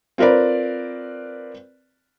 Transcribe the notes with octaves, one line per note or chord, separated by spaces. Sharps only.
C4 F4 A#4 B4 D5